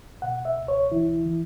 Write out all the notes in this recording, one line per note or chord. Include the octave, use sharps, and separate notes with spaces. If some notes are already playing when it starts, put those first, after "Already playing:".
B2 F#5
E5
C#2
C#5
E3 E4
E3